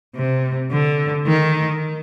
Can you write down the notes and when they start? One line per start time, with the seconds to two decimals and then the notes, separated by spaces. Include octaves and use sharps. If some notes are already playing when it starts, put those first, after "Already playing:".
0.16 C3
0.71 D3
1.27 D#3